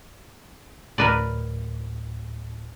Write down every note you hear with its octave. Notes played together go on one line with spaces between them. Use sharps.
D2 A2 A#4 B4 D5